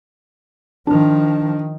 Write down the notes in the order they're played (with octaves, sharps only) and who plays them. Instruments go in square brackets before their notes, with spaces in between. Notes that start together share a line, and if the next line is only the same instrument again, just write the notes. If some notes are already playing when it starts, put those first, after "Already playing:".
[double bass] D#3 F3 [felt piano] D4